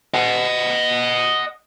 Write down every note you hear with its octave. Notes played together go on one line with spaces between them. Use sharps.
D#5 F#5